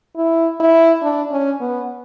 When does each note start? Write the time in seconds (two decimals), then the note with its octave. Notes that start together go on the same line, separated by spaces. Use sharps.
0.16 E4
0.60 E4
1.02 D4
1.31 C#4
1.60 B3